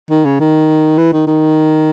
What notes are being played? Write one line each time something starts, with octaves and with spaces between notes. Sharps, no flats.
D#3
C#3
D#3
E3
D#3
D#3